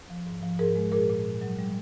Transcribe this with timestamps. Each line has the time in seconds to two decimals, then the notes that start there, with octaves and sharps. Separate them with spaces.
0.10 F3
0.26 G#2
0.43 F3
0.59 G#2 G#4 A#4
0.75 G#3
0.92 A#2 G#4 A#4
1.09 A#2
1.25 A#2
1.41 F#3
1.59 G3